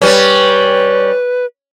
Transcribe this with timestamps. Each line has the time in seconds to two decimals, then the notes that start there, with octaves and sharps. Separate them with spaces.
0.02 G3 C#4 B4